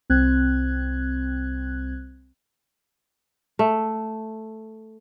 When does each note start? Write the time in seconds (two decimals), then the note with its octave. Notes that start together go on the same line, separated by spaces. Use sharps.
0.09 C2 C4 F#6 G#6
3.59 A3